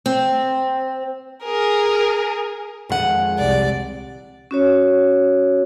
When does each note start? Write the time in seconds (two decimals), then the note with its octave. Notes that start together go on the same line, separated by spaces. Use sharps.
0.06 C4
1.44 G#4 A#4
2.90 A#1 F2 D#3 G#3 F#5
3.38 C2 D5
4.51 C#4 F#4 C#5